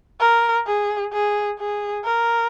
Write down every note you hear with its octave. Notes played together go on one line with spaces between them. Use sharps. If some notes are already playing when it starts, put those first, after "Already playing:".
A#4
G#4
G#4
G#4
A#4